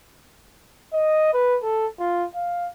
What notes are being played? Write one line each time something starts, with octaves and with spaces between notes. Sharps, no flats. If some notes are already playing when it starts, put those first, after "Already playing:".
D#5
B4
A4
F4
F5